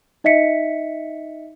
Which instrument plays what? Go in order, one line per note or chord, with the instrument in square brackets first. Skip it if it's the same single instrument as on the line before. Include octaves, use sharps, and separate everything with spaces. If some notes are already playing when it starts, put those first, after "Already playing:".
[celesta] D#4 D#5 E5 B6 C#7